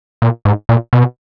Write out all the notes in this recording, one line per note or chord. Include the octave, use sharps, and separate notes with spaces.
A#2
G#2
A#2
B2